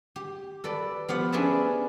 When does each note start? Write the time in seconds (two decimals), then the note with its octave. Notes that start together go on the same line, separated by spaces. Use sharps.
0.16 G4
0.64 A4 B4 D5
1.08 F3 B3 G4 F#5
1.32 C#4 D4 G#4 B4 E5 A5